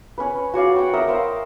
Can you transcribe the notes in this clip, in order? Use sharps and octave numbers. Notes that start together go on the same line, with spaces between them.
C#4 B4
F#4 C#5 D5 F5
F#5 G5
A#4 D#5 E5
C5 F5